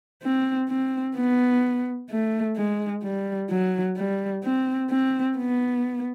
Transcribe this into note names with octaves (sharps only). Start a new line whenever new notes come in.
C4
C4
B3
A3
G#3
G3
F#3
G3
C4
C4
B3